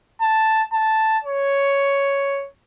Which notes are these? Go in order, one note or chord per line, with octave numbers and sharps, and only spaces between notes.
A5
A5
C#5